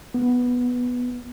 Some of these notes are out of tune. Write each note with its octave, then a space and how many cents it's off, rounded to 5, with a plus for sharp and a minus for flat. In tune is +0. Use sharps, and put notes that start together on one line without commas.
B3 -5